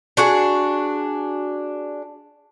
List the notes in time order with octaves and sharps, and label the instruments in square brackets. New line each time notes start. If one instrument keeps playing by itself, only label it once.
[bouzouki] D4 F#4 G#4